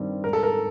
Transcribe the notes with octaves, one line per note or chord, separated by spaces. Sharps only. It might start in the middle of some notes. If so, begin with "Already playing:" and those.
Already playing: G2 D#3 G3 C4
G#2 A#4
A4
A#4